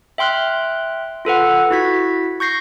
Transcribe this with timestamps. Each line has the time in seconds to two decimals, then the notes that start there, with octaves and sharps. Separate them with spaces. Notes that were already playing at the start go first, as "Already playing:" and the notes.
0.18 E5 G5 C6 F6 F#6
1.25 F4 A4 B4 F#5
1.71 E4 F#4 G#6 B6
2.40 C#6 G6 A#6 C7